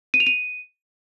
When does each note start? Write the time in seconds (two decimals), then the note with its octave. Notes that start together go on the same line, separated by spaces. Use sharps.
0.14 D#7
0.20 F7
0.27 D#7